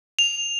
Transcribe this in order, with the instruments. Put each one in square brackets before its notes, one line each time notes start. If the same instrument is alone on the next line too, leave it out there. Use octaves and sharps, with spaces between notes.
[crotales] F7